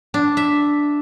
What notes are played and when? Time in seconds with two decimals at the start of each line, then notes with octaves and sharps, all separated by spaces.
0.14 D4
0.37 E5